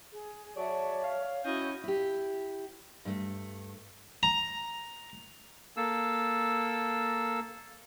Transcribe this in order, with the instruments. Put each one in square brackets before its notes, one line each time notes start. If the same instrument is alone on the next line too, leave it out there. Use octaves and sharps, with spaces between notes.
[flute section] G#4
[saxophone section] F#3 G#4 D5 [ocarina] C#5 [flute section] E5 A5 C#6
[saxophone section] F5
[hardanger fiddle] C#4 D#5 [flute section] E4 F#4 G6
[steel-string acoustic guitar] E4 G4
G2 A3
[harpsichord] A#5
[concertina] A#3 A4 E6